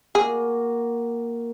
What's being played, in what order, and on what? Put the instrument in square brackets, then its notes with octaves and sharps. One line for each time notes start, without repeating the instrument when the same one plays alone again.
[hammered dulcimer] A#3 F#4 G#5 [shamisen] G#4